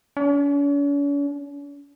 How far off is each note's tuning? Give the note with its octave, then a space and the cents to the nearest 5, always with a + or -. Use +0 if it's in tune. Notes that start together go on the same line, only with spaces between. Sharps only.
C#4 +45